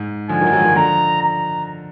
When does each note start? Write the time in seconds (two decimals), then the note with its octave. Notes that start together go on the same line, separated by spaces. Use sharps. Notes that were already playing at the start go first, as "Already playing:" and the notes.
Already playing: G#2
0.29 D3 F3 G#5
0.41 D#3 F#3
0.47 F3
0.52 D#3 F#3
0.60 G#3
0.64 D#3 F#3
0.75 D3 F3 A#5
1.22 A#5